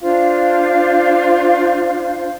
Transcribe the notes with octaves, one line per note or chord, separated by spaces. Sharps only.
D4 F4 C5 F5